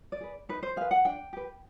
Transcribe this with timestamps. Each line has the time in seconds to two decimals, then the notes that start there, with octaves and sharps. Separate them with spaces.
0.12 D5
0.21 G#4 B4
0.49 D#4 B4
0.63 C5
0.76 G#4 B4 F5
0.91 F#5
1.05 D4 G5
1.33 G4 B4